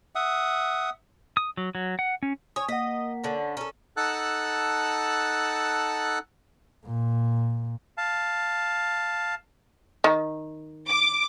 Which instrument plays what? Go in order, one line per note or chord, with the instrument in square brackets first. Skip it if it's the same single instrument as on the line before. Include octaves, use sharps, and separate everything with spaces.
[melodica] E5 F#5 D#6
[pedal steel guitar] D#6
F#3
F#3
F#5
C#4
[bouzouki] C#5 [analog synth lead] G#5 [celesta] D#6
[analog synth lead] A#3 [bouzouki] D#5 [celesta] F#5 B6
[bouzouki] D3 C#4
[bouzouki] C#4 A4 [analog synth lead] A#4
[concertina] D#4 A4 F#5 A5 E6 F#6
[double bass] A#2
[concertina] F5 A5
[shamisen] D#3
[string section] D6